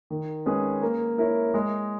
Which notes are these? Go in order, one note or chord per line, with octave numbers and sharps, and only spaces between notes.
D#3
G#3 C#4 G#4 B4
A#3
E4 A#4 C#5
G#3